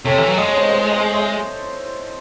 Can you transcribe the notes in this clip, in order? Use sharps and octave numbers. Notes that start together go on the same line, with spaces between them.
C3 A4 C#5
E3
F#3
G#3 D#5
C#5
C5 D#5
C5 D#5
C5 D#5
C#5 E5